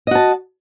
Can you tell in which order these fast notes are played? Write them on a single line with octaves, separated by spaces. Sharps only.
D#5 F#4 A5